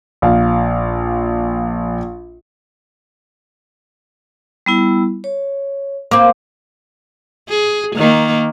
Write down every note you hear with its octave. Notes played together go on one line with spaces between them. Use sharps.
A#1 F5
G3 B3 E4
C#5
A#3 C4 D6
G#4
D#3 A#3